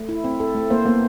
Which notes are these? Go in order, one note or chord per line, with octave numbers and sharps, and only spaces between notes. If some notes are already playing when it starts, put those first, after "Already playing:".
Already playing: A3
E4
C4
A4
A3
A#3 C5
A#3 B3